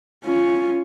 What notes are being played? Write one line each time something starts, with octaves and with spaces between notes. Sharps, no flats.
C#4 F4